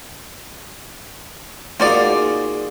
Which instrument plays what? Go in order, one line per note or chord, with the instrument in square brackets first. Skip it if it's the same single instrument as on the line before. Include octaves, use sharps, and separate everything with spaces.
[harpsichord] A#3 D#4 G#4 [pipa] F4 F#4 D5